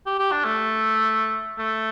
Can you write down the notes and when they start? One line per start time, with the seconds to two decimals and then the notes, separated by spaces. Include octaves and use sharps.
0.06 G4
0.19 G4
0.32 D4
0.45 A3
1.58 A3